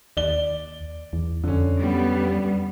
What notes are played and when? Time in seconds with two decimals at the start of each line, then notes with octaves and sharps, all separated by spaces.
0.17 D#2 D5 G7
1.13 E2
1.44 F2 D3 C#4
1.78 G3 B3